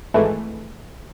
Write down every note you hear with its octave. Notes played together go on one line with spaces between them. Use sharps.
G#1 G#2 E3 A3